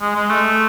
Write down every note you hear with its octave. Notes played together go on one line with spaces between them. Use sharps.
G#3
G#3
A3